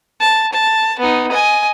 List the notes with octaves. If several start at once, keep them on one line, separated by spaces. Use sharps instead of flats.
A5
A5
B3 D#4
D#5 G#5